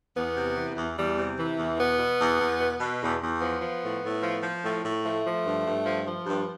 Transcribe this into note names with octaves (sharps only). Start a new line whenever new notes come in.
E2 B3
C3
E3
E2
E2 G3
C3
E3
E2
B2 B3
B2
E2
E2
B2
B2
E2
E2
F3 B3
F3
A2
A2
F3
F3
A2
A2
F3 A3
F3
G2
G2
F3
F3
G2